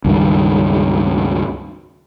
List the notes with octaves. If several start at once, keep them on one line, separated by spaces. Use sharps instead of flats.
C#2 G2 D#3